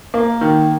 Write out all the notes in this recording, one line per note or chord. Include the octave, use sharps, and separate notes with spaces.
A#3
D#3